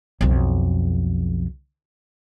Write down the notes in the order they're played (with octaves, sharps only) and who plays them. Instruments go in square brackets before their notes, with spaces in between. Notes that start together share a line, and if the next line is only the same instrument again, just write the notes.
[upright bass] B1 F2